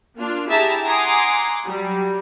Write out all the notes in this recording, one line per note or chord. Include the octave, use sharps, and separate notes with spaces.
A#3 D4 F4
E4 G4 G#4 E5 A5 A#5
F#5 G#5 A#5 C6 D6 D#6
F#3 G3